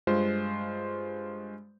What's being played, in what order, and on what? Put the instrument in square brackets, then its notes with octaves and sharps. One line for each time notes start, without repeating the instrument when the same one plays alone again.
[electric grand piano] G2 G#3 F4 C5 C6